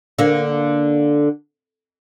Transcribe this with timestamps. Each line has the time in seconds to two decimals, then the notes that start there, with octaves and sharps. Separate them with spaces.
0.19 D3 A#3